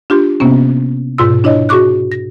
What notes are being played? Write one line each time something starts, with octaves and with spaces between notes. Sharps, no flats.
D4 F4 G4 C6
C3 A#3 B3 C#4
G#2 B2 F4 C6 E6
D4 E4 C#5 D#5
F#4 G#4 C#6 D6 F#6
A#6